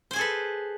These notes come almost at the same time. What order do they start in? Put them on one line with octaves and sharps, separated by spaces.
C5 G#5 G#4 A4 B4